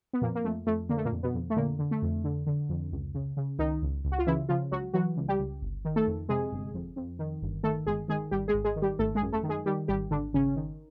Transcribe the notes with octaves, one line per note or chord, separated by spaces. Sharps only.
B3
F2 A#2 A#3
A#3
F2 A3
F2 A3
D3 A#3
A3
A#2 A#3
F2
B2 B3
F2
A3
A#2 D3 A#3
D3
A3
F2
D3
D3
F2
C#2
C#3
C#3
C#2 D#3 D#4
C#2
C#2
F#4
F4
C#3 E3 E4
C#3 F3 F4
C#2 F#3 F#4
E3 F#3 F#4
C#2
G3 G4
C#2
G1
D#3
A3 A4
F2
C3 G#3 G#4
G1
F2
F2
D#3
G1
D#3 A3 A4
G1 G#3 G#4
D#3 G#3 G#4
G#1 G3 G4
G#3 G#4
G#1
G#3 G#4
D#3
G3 G4
G#1 A3 A4
G#3 G#4
F#2
A3 A4
D#3
G#3 G#4
D#3 G3 G4
G#1 G3 G4
G#1 D3 D4
G#1 C#3 C#4
D#3